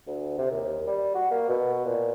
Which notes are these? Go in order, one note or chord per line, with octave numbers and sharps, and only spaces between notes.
D2
C3
D#2
G3
F#4
A#3
B2
A#2